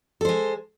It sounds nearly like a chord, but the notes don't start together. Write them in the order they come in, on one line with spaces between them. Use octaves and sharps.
A4 C5 G#3